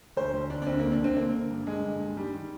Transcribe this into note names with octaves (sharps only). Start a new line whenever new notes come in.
D2 C5
D2
D3 D4
D4
D2 C4
D3 A#3
D4
D3 C4
D3 A#3
D3
G2
D3 G#3
G2
G2
D#3 G3
D#3